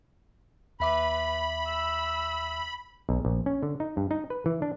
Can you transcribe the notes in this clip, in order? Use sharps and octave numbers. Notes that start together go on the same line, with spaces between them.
D#2 B4 E5 B5 D6
E6
B1
A#1
C#4
D3
D#4
G2
D#4
B4
E3
D4